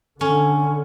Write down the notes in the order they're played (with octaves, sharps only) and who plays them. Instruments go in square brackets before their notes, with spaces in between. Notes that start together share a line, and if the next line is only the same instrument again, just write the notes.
[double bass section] D3 [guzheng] C#4 [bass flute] A4